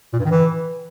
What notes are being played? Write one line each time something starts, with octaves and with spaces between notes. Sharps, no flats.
A#2
G2
D#3
E3